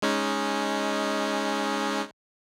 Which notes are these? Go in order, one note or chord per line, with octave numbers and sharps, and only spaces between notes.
G#3 C#4 D#4